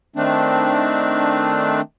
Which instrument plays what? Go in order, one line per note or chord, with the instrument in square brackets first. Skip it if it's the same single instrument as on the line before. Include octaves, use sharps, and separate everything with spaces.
[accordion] D#3 A3 C4 D4